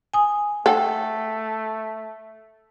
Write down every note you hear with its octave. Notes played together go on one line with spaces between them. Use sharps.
G#5 D#6
A3 A4 F#5 G5